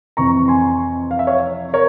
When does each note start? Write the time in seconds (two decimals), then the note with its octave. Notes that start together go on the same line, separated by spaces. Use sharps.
0.17 F2 C3 E3 A#5 C#6
0.48 G#5 C6
1.11 F5
1.19 E5
1.27 C#5 F5
1.73 A#4 C#5